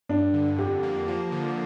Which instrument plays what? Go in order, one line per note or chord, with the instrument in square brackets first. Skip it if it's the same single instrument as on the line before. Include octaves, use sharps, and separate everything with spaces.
[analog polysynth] G2 [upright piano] D4
[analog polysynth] D3
[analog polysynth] F2 [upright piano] G4
[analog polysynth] A#3
F3
D3